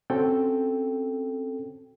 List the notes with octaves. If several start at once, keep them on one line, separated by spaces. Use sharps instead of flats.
C4 C#4 F#4 A4 G5